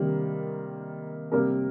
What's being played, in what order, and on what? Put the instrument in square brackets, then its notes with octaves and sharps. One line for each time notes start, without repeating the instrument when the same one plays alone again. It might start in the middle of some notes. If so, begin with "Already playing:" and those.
Already playing: [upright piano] C3 D#3 G3 A#3
C3 G3 A#3 A#4